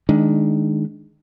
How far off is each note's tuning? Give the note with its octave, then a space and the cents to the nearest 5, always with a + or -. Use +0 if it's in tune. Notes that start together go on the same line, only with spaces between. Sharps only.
D#3 +0 G#3 +20 D4 +0